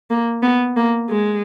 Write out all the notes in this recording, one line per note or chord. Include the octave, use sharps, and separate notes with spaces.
A#3
B3
A#3
G#3